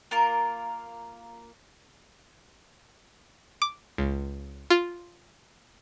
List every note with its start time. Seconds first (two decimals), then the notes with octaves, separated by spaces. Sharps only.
0.11 A#3 F4 A#4
3.62 D6
3.98 C#2
4.70 F4